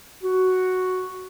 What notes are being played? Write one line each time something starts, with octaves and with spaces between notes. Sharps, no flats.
F#4